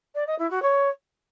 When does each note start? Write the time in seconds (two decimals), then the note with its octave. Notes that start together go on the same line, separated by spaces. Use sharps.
0.15 D5
0.27 D#5
0.38 E4
0.50 F#4
0.62 C#5